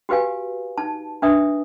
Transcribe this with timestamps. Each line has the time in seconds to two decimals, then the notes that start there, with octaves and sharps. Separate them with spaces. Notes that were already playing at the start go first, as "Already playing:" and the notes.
0.09 F#4 G4 B4 F5 G#5
0.78 D#4 A5
1.22 D4 B4 E5 D#6